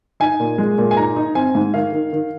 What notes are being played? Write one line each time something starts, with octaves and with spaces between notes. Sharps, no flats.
D#4 G#5
A#2
G#3
A#2
G#5
D#4 A#5
D#4
C4 G#5
G#2
D#3 F5
D#3
D#3